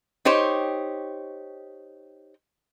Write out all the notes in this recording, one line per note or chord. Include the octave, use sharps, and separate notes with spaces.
D#4 G4 C5 C#5